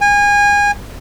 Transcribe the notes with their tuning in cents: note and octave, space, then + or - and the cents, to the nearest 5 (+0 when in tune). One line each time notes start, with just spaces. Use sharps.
G#5 -25